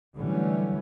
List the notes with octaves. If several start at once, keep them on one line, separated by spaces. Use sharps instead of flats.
D3 E3 F#3 G3 A3 C#4